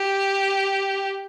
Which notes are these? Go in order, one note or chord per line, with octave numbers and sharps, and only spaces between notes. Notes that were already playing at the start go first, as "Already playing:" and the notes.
Already playing: G4